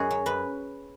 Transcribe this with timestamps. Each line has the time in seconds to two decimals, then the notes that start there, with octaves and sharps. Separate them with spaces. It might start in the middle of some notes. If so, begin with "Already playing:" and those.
Already playing: F#2 F#4 G#4
0.11 F#3
0.26 F#2 B4